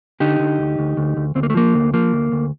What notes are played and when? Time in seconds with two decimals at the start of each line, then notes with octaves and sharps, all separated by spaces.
0.20 D3 D#4 G4
0.40 D3
0.59 D2
0.79 D2
0.97 D2
1.17 D2
1.35 D2 C4
1.43 A#3
1.50 A3
1.55 F3 A#3
1.74 D2
1.93 F3 A#3
2.13 D2
2.32 D2